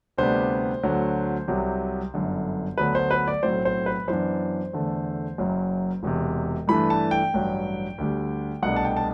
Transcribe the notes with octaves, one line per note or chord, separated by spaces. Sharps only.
D2 C3 G3 B3 D4 C5
D2 D3 F#3
C2 C3 F#3
G1 F#2 D3
D2 D3 F#3 B3 D4 B4
C5
B4
D5
B1 A2 F#3 C4 C5
C5
B4
F#2 E3 B3 D4 C5
E2 D3 A3
F#1 F#2 F#3
E1 E2 C3
G2 E3 A3 D4 B5
A5
G5
A1 G2 F#3
D2 D3 G3
C2 B2 A3 D4 F#5
A5
G5
A5